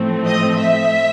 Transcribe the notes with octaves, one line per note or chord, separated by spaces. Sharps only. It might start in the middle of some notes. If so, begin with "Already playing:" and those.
Already playing: A2 F3 A3 C4
D#5
E5